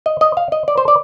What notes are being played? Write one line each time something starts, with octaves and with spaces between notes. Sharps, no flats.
D#5
D#5
F5
D#5
D5
C5
D5